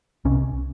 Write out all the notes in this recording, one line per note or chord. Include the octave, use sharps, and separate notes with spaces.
C2 C3 C#4